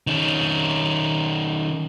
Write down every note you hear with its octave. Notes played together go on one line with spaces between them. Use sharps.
D#3 C#4